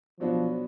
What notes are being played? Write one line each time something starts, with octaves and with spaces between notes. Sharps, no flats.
B2 F3 F#3 B3 D4 F#4